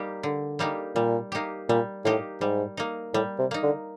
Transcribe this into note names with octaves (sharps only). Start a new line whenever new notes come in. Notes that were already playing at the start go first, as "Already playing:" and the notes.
Already playing: G3 A#3 D#4 G4
D3
G3 A#3 D#4 G4
A#2 G3
A#3 D#4 G4
A#2 G3
A2 A#3 D#4 G4
G#2 G3
A#3 D#4
A2 G3
C3
A#3 D#4
D3